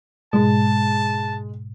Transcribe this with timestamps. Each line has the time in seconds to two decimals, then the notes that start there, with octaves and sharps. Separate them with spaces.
0.33 G#2 B2 G#3 A5